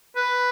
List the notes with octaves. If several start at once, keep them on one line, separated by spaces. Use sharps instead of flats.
B4